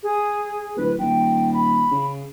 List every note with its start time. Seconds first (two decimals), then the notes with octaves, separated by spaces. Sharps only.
0.03 G#4
0.77 D1 B4
0.99 D#1 G5
1.53 B5
1.91 C#3